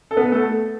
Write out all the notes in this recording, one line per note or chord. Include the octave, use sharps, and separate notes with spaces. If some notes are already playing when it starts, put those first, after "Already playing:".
A4
B3 B4
A3 A4